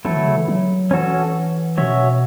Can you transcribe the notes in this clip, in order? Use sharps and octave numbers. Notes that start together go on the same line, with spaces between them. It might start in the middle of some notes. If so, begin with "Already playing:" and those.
E3 F#3 A3 E4 A4
D3
C#3
E3
F#3
E3 C#4 F#4 A4
B2 C#4 F#4 C#5 E5